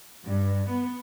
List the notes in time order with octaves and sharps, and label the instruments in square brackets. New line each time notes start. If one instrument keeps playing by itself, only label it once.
[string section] G2
B3